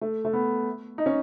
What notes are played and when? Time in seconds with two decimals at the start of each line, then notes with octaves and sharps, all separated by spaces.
0.01 A3
0.25 A3
0.33 B3
0.98 D#4
1.06 C#4